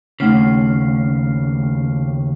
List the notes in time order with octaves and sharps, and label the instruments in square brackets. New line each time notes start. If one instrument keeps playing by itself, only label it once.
[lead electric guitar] D#2 C#3 [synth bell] A3 F6 C7